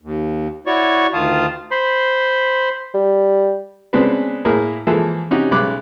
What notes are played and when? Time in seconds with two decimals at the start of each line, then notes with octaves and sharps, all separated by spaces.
0.02 D#2
0.67 E4 F#4 C#5 D5 C#6
1.13 D2 D#3 F4 F5 A5 D#6
1.71 C5 B5 C6
2.94 G3
3.93 C#3 G#3 B3 C4 D4 B4
4.45 A2 A#3 E4 G#4 A#4 A#5
4.87 E3 F3 G#3 A#3 G#4 A4
5.31 C3 C#4 D#4 F#4 G4
5.51 B1 C#3 G#3 B5 D6 F#6